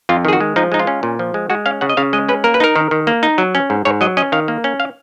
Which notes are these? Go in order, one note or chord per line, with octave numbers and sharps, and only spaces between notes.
F2 F4
D#3 G#4
F#4
G#3
F3 D#4
G#3 D#4
F4
C#4
A#2
F3
G#3
G#3 F#4
C#4 F5
C#3 F#5
D#5
C#3 F5
G#3 D#5
C#4 B4
A#3 A#4
B4
D#4 A#4
D#3
D#3
A#3
D#4
F#3
C#4
G#2
G#2 C#5
F#3 D#5
C#4 D#5
D#3 F5
A#3
C#4
F5